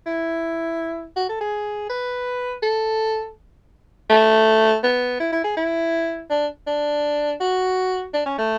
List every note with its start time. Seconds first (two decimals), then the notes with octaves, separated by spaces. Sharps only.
0.06 E4
1.16 F#4
1.29 A4
1.41 G#4
1.90 B4
2.63 A4
4.10 A3
4.84 B3
5.20 E4
5.32 E4
5.44 G#4
5.57 E4
6.30 D4
6.67 D4
7.41 F#4
8.14 D4
8.26 C#4
8.38 A3